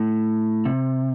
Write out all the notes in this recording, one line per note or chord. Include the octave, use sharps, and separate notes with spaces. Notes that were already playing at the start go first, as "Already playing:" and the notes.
Already playing: A2
C3